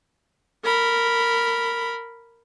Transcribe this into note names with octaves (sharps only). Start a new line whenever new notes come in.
A#4 B5